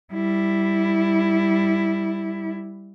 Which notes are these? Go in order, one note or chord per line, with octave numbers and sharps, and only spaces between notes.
G3 E4